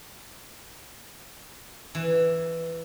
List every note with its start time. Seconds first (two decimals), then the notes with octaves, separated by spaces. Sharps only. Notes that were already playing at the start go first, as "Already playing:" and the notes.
1.95 E3